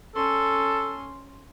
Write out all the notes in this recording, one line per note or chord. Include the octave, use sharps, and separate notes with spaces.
C#4 A4 C6